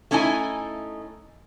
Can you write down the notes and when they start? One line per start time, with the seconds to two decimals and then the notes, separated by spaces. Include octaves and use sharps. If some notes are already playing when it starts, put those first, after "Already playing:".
0.11 A3 C#4 D#4 E4 G#5